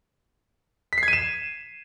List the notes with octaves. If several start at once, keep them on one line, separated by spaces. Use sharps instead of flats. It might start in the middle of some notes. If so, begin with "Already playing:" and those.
B6
C7
G#6
D#7
E7